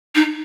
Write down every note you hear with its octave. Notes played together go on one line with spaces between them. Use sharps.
D#4